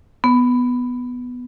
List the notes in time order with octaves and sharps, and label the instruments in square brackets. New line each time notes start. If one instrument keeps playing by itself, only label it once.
[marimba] B3